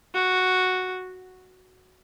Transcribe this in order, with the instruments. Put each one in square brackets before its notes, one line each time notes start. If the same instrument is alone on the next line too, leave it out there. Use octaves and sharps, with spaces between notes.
[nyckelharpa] F#4